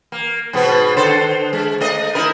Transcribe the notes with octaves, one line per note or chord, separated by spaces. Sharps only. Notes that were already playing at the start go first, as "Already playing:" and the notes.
A#3
G#2 B2 B3
D3 A4 C5
G#3
A3 D#5
D#4 E4 A#4